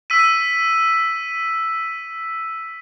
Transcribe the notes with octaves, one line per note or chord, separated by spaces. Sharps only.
E6 B6 D#7